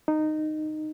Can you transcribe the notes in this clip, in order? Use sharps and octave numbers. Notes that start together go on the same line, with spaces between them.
D#4